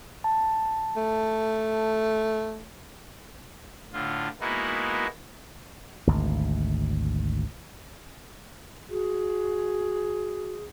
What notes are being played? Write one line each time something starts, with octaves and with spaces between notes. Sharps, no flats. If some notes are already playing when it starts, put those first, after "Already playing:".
A5
A3
A2 D3 F4
G#3 A#3 B3 D#4 E4 F#4
G#1 D2
F#4 G#4